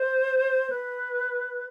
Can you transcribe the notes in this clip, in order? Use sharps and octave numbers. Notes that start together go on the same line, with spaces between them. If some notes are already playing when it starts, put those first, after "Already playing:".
Already playing: C5
B4